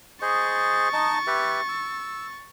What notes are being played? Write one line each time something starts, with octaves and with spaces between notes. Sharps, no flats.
G#4 C5 D#5 C#6 A6
D#4 D#5 A5
G4 B4 E5
E6